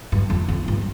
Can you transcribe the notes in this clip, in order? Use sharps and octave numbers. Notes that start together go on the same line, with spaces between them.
G2
F2
F2
G2